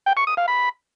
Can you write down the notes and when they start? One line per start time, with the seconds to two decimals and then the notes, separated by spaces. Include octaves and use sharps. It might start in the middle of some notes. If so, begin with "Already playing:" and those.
0.06 G5
0.17 C#6
0.27 D#6
0.37 F5
0.48 B5